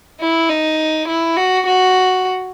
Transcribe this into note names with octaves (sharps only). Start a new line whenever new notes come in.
E4
D#4
E4
F#4
F#4